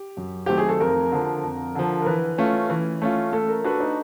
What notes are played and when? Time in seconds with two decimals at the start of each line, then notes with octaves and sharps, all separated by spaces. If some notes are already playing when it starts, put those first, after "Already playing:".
Already playing: G4
0.17 F#2
0.46 D#3 F#3 A3 C4 G4
0.58 G#4
0.69 A4
0.80 F2 A#4
1.12 D3 F3
1.43 F2
1.75 D3 F3
2.02 A#4
2.06 E3 B4
2.38 A3 C#4 F4
2.70 E3
3.02 A3 C#4 F4
3.33 A3 A4
3.49 A#4
3.64 D4 F#4 A4 B4
3.80 D#4